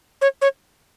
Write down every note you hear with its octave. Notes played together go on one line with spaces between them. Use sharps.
C#5
C#5